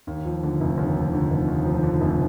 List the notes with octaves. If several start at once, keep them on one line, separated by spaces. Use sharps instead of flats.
D#2
F3
D3
F1
D#2
F3
D3
F1
D#2
F3
D3
F1